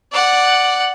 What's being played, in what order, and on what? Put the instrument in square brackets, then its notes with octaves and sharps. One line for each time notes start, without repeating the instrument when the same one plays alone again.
[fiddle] D5 F#5